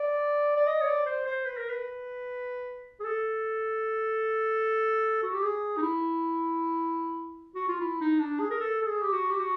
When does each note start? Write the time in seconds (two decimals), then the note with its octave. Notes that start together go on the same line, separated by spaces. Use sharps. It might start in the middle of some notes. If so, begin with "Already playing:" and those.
Already playing: D5
0.57 D5
0.67 D#5
0.81 C#5
0.87 D5
1.06 C5
1.27 C5
1.45 B4
1.57 A#4
1.70 B4
3.00 G#4
3.04 A4
5.23 F#4
5.33 G4
5.43 G#4
5.78 D#4
5.82 E4
7.55 F#4
7.68 F4
7.81 E4
8.01 D#4
8.20 D4
8.40 G#4
8.51 A#4
8.60 A4
8.82 A4
8.86 G#4
9.03 G4
9.13 F#4
9.31 G4
9.39 F#4